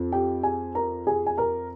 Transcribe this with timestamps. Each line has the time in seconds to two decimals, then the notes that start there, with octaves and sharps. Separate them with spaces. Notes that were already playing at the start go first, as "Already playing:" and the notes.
Already playing: F2
0.12 G4 G5
0.43 G#4 G#5
0.75 A#4 A#5
1.07 G#4 G#5
1.26 G#5
1.38 A#4 A#5